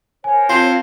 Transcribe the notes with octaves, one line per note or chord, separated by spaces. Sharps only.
A#4 C5 C#5 G#5
C4 F4 A5 C6